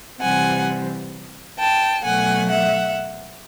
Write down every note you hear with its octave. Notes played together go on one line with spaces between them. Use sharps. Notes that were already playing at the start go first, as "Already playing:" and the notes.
C3 E3 G3 C4 F#5 G#5
G5 A5
B2 F#3 A3 F#5 G#5
E5 F#5